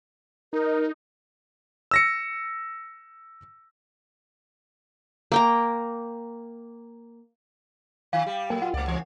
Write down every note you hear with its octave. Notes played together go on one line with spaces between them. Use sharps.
D#4 A#4
E6 A#6 C#7
A#3 G5 A#5
D#3 F5
G3 G4
A#2 F#3 A#3 A#4 G#5
F4 F#5
C#2 A3 D5
E3 C4 C#4